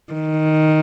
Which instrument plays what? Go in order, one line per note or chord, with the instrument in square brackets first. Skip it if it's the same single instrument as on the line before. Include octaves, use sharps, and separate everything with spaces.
[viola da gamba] D#3